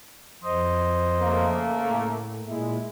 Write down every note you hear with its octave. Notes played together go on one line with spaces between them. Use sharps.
F2 C5 D#5
C#3 A3 A#3
A2
A#2 G#3 E4